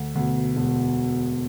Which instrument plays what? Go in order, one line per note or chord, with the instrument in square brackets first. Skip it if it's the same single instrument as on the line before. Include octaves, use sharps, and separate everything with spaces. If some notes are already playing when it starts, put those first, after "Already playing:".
Already playing: [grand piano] D2
[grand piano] D2 [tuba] B2
[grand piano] E1